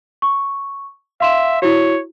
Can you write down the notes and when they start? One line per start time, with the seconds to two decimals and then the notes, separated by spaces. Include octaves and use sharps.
0.22 C#6
1.21 E5 F5 C6 E7
1.62 E4 F#4 C#5